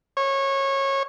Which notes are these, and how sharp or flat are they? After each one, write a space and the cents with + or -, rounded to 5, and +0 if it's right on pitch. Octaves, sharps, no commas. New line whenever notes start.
C#5 -20